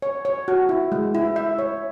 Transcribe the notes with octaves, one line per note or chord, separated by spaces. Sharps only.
C#5
C#5
F#4
E4
G#3
E4
E5
C#5